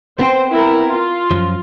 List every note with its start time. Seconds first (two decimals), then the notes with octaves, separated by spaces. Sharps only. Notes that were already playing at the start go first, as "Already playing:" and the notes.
0.19 B3 C4 C5 G5
0.51 E4 A#4
0.90 F4
1.31 F#2 F3